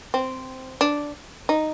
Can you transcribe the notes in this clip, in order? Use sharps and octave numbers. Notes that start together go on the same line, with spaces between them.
C4
D4
D#4